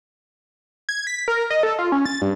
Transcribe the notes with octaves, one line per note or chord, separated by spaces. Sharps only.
G#6
B6
A#4
D#5
A4
F4
C#4
A6
G2